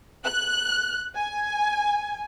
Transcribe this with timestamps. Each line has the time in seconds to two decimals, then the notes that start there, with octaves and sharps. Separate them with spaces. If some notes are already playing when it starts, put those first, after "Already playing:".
0.25 F#6
1.16 G#5